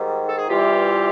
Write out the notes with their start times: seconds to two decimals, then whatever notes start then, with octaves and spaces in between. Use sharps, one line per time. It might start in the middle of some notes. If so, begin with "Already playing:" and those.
Already playing: G#2 D#3 G3
0.28 A4
0.38 G#4
0.48 E2 C3 E3 G3 F4 G4